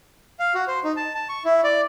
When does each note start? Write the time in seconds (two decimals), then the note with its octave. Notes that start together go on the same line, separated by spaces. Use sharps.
0.39 F5
0.54 F#4
0.67 C5
0.84 D#4
0.97 A5
1.14 A5
1.29 C#6
1.45 E4
1.64 D5